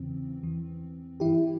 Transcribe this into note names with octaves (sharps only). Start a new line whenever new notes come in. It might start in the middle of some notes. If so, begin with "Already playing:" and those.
Already playing: E2 C#3 E3 C4
E2 E3
G2 E3 E4 G4